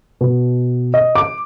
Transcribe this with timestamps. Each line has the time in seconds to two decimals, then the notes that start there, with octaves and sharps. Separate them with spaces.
0.21 B2
0.94 D#5
1.15 D6